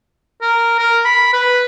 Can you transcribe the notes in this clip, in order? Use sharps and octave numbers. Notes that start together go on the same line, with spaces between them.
A#4
A#4
B5
B4